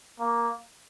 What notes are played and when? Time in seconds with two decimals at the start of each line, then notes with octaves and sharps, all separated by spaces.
0.20 A#3